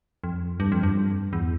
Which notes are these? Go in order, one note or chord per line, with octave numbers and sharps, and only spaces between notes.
F2
G2
F2
G2
E2